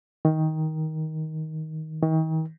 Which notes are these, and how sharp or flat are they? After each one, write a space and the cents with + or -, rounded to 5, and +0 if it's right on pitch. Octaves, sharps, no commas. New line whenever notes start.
D#3 +15
D#3 +40